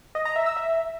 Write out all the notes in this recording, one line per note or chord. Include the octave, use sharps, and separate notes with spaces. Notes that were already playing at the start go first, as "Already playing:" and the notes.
D#5
A#5
E5
E6
E5